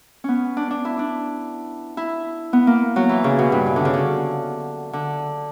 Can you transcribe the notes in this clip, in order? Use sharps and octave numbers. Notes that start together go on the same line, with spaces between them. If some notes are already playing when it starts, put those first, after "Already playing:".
B3 C#4
D4
D4
E4
D4
E4
B3
A#3
F#3
E3
C#3
B2
G2
E3
D3
C#3
D3
D3